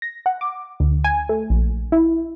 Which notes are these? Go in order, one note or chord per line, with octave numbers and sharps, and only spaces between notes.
A#6
F#5
D6
D2
G#5
A3
A#1
E4